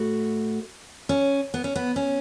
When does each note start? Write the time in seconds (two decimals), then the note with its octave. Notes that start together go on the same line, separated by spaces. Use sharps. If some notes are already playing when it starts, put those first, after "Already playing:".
Already playing: A2 A3 F#4
1.09 C#4
1.54 B3
1.64 C#4
1.76 B3
1.96 C#4